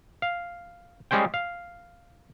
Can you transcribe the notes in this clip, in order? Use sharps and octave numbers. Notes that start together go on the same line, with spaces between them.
F5
G3 G#3 C#4 C5 G5
F5